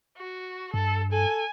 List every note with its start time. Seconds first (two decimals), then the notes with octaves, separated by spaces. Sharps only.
0.17 F#4
0.74 G2 A4
1.12 A4 G#5